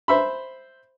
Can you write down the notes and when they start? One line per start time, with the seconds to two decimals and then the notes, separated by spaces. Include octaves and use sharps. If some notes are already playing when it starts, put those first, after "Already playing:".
0.08 C5 E5 B5